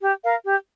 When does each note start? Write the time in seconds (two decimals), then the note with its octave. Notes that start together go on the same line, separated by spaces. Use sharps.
0.02 G4
0.23 A#4 F5
0.46 G4